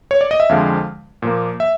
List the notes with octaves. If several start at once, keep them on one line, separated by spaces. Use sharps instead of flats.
C#5
D5
D#5
E5
F2 D3 F3 G#3 F5
A#2 F3 A#3
E5